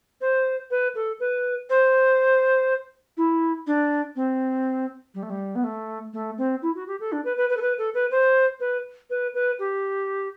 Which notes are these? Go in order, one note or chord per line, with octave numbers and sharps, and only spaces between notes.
C5
B4
A4
B4
C5
E4
D4
C4
G3
A3
G3
B3
A3
A3
C4
E4
F#4
G4
A4
D4
B4
B4
B4
A4
B4
A4
B4
C5
B4
B4
B4
G4